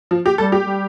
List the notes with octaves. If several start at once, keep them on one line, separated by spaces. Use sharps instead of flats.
F3
G4
G3 A4
G4
G3